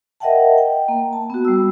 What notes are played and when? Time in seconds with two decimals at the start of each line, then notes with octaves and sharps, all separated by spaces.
0.20 A#4 D#5 E5 F#5 G5 A5
0.58 G5
0.88 A#3
1.13 A5
1.30 B3 F#4
1.45 G3 E6